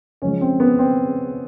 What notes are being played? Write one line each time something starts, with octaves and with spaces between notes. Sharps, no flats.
C#3 F3 G#3 C#4
C4
B3
C4